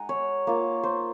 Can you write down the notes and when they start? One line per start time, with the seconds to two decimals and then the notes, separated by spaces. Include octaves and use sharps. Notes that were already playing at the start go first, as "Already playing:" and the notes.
Already playing: G#3 D#4 F#5 G#5 A#5
0.09 C#5
0.47 A#3 F4
0.83 C5